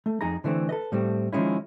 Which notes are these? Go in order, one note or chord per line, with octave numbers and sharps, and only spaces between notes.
A3
F2 D#4 G#4 A#5
D3 E3 A3 C4
A4 B4 D#5
A2 G3 A3 C4
D#3 F3 F#3 G#3 C#4 E4